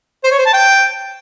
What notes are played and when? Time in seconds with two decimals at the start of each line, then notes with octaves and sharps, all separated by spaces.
0.24 C5
0.31 C#5
0.39 C5
0.46 A5
0.53 G5